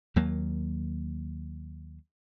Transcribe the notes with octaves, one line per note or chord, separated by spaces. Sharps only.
D#2 F#3 A#3